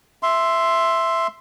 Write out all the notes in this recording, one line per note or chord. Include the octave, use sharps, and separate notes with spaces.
E5 C6